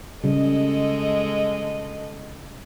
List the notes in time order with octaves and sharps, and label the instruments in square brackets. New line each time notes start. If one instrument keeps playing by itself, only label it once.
[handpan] C#3 G3 [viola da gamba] G#3 A4 D#5